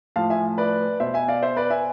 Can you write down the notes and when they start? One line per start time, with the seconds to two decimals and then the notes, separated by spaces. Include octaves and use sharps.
0.16 A2 F3 F5 A5
0.30 E5 G#5
0.58 B4 D5
1.00 B2 C5 E5
1.14 E5 G#5
1.28 D5 F5
1.42 C5 E5
1.57 B4 D5
1.70 E5 G#5